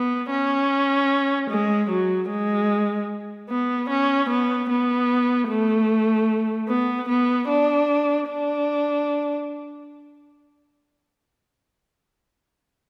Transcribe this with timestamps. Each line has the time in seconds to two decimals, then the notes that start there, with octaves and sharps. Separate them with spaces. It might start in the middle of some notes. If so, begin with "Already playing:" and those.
Already playing: B3
0.31 C#4
1.50 G#3
1.90 F#3
2.30 G#3
3.50 B3
3.89 C#4
4.30 B3
4.69 B3
5.49 A3
6.69 B3
7.09 B3
7.48 D4
8.28 D4